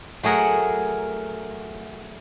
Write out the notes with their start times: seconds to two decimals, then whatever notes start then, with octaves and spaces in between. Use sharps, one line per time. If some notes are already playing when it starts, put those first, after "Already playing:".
0.23 F#3 A3 G#4 A#4 F#5